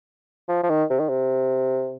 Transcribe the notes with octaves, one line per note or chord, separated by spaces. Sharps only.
F3
F3
D#3
C3
D#3
C3